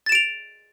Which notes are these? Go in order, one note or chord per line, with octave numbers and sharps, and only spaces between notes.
A6 D7 E7 F7